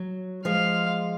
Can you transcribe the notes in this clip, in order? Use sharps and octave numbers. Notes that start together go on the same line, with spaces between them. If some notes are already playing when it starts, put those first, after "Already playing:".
Already playing: F#3
F3 G#3 F5